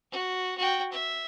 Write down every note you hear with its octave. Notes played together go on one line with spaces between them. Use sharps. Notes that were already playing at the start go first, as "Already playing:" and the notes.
F#4
F#4 G5
E5